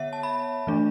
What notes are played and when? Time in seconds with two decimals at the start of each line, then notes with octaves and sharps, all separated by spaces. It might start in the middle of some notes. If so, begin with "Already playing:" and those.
Already playing: D3 B3 C#5 E5 F#5
0.13 A5
0.23 B5
0.67 E3 A3 D4